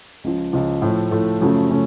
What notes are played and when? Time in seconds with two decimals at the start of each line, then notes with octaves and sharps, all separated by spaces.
0.24 C#2 C#3 F3
0.53 C#2 C#3 F3
0.82 A2 F3 A3
1.11 A2 F3 A3
1.41 F#2 C#3 F3 A3 C#4
1.71 C#3 A3 C#4